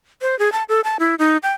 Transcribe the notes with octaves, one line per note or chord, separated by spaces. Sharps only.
C5
G#4
A5
A4
A5
E4
D#4
G5